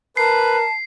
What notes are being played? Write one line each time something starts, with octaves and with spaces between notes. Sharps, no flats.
A#4 B4 A5 C7